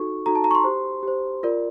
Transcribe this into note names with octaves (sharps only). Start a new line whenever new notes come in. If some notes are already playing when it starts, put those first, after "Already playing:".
Already playing: D#4 F#4 A4 C#6
D#4 F#4 A4 A#5
A5
A#5
C#6
C6
G4 C5
G4 C5
F4 A#4 D5